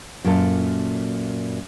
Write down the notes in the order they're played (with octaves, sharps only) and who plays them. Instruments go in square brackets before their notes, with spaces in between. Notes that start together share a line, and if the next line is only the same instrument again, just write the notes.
[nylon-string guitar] F#2 A#2 A4